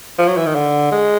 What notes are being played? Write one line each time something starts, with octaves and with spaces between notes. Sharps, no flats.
F3
F#3
E3
D#3
D3
G#3